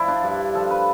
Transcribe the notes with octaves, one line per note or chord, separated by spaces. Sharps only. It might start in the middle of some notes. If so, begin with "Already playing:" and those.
Already playing: F3 E4 C5 D5
D4
G2
F3 A4
B4